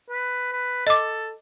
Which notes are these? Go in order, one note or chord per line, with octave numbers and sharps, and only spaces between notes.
B4
B4
A4 D#5 D6